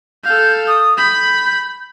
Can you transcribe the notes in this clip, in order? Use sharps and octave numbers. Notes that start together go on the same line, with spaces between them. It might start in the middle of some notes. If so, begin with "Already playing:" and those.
A4 F5 G6
D#6
B5 G6